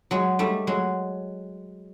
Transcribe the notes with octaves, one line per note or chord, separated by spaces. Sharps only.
F#3 G#3
G3 A3
F#3 G#3